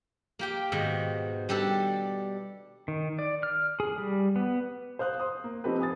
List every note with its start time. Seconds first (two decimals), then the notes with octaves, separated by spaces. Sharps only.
0.39 A#3 G4 G5
0.72 G#2 B2 D#3
1.49 G3 D4 G4 A4
2.88 D#3
3.19 D5
3.43 F6
3.80 G#4
3.98 G3
4.36 B3
4.99 C5 F5 D#6 F#6
5.20 C6 D#6
5.44 A#3
5.64 F3 C4 D#4 G4 A4 B4
5.79 B4 G#5 D#6 A6